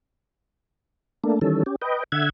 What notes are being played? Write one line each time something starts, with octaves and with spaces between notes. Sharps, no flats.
A3 A#3 D4
D#3 E3 G3 C#4 A4
C#4 G4
B4 D#5 G5
D3 E5 F#5 G#6